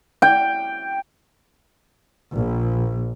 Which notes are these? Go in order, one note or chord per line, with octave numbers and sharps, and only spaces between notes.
G5
A#1